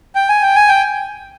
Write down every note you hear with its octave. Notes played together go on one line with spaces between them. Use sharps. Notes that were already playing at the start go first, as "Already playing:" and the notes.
G5
G#5
G5
G#5
G5